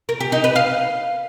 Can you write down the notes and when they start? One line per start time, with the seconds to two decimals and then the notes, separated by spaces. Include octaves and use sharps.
0.09 A#4
0.20 G4
0.32 D#4
0.44 B4
0.56 F5